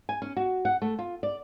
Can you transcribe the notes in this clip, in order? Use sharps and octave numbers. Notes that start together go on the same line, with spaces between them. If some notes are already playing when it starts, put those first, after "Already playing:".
G#5
C#4
F#4
F#5
A3
F4
D5